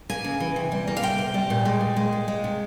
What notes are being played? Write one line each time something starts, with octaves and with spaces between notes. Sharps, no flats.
A#3 G#5
C#3
E3
C3
G3
A#3
F5
C3 G5
C3
G3
A#2
G#3
A#2
G#3
A#2
G#3
C3